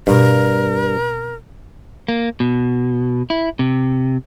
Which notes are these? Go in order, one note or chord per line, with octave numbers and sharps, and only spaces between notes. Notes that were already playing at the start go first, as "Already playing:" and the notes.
G2 B2 C4 A#4
A#3
B2
E4
C3